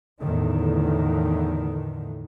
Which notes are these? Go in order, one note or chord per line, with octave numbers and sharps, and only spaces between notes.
E2 A2 D3 D#3